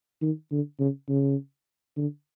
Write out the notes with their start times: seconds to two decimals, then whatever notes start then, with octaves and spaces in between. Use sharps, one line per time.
0.22 D#3
0.52 D3
0.80 C#3
1.09 C#3
1.97 D3